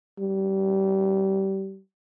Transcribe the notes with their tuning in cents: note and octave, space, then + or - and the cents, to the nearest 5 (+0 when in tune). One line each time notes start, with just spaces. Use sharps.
G3 -25